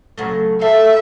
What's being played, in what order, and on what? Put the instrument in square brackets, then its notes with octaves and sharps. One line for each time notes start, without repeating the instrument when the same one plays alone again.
[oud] C#3 F#3 A3
[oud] A4 F5 [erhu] E5